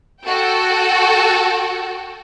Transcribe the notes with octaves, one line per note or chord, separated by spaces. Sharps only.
F#4 A4 G5